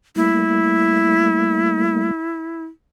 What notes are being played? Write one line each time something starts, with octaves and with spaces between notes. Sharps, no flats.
G3 A3 A#3 E4